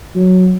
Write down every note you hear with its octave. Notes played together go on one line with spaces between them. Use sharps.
F#3